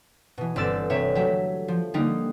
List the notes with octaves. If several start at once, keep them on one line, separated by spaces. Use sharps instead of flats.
B2 E3
G1 C4 D5 E6 A6
C3 C#5 E5
F#3 A3 G4 E5
F3
D3 G3 A#3 D#4